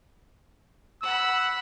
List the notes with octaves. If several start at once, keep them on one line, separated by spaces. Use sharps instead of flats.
F#5 B5 E6